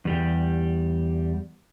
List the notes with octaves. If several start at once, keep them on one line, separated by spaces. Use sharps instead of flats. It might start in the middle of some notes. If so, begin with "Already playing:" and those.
E2 G3 G4